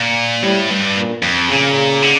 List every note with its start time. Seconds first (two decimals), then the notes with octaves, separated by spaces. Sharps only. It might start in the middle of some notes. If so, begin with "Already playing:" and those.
Already playing: A#2
0.43 A2 G3
0.70 G2
0.96 A#2
1.23 F2
1.49 A#2 C#3
2.03 D3